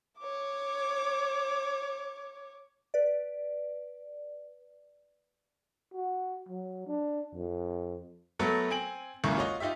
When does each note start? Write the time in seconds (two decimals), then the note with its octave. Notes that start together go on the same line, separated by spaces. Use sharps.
0.19 C#5 D6
2.94 B4 D5
5.94 F#4
6.48 F#3
6.87 D4
7.35 F2
8.39 F#3 A3 B3 A4 A#4
8.70 C4 G#5 D7 F#7
9.24 G#1 C#2 F#2 A#3 E4 C#6
9.37 F4 F#4 C#5 D#5
9.60 D#4 F4 G4 E5